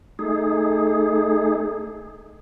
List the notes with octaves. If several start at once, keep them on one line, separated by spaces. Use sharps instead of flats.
A3 D#4 G#4